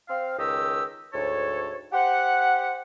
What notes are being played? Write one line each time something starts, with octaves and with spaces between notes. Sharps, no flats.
C4 F5
C#2 D#3 G4 D#5 E6
D2 G#2 A4 C#5
G4 C5 F#5